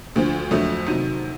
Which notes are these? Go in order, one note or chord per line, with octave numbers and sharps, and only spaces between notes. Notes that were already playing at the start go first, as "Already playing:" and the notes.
D2 D3 F3
F2 D3 F#3 A3
C3 D#3 F#3